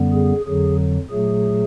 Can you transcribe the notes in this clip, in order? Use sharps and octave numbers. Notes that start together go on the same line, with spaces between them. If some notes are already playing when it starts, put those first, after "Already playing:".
Already playing: F#2 D3 G3 B3
G#4
F2 D3 F#3 G#4
A#2 F#3 A3 G#4